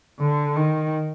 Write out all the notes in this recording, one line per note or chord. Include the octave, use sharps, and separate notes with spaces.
D3
D#3